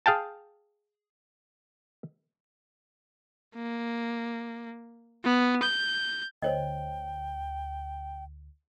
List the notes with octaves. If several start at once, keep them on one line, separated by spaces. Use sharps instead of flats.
G#4 F5 G5 A5
A#3
B3
G6
D2 C5 C#5 D#5 G5